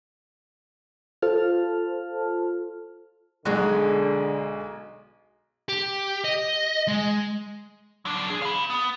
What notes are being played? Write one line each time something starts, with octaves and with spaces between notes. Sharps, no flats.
F4 A4 C5 A5 F6
B1 D3 G#3 F#4 G#4 C#5
G4
D#5
G#3
F#3 D4
G#4
F5 B5
B3